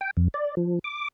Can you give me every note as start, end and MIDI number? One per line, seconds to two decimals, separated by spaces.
0.01 0.11 79
0.17 0.28 41
0.34 0.55 74
0.57 0.79 53
0.84 1.08 86